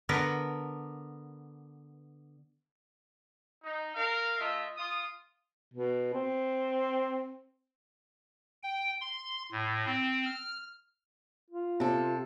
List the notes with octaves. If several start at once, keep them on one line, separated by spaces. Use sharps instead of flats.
D3 B3 A#4 B4
D#4
A#4 F5
A3 F4 D#5 E5
F4 D#6
B2
C4
G5
C6
A2
C4
F6
F4
C3 A4